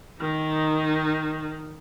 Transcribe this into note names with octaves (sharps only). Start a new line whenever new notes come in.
D#3 D#4